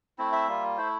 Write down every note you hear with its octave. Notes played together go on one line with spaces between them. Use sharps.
A3 C4 E4
E5
G3 A#3 F4
A3 E4 C5